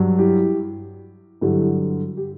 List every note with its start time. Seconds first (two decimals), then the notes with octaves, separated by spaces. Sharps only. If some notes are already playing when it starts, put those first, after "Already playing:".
Already playing: G2 F#3
0.19 E4 G4
1.41 G2 D3 F#3 E4 G4
2.17 G4